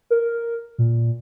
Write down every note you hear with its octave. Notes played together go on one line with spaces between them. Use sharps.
A#4
A#2